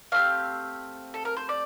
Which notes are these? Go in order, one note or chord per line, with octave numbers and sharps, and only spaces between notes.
A3 C4 G4 F5
A4
A#4
C5
D5